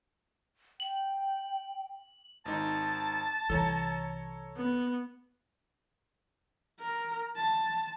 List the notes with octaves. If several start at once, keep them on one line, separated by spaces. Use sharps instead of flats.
G5 F#7
G#1 D#4 A5
C2 E3 A4 C#5 A#5
B3
A#4
A5